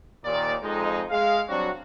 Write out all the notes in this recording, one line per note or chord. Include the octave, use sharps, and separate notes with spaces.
D#2 A#2 D#3 D5
F2 G#3 D#4
G#3 F5
F#3 G3 C4 D4 F#4